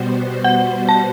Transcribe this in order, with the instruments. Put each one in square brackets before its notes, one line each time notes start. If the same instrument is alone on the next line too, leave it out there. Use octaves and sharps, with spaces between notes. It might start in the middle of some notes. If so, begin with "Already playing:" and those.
Already playing: [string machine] B2 G3 B3 F#4 C5
[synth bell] F#5
A5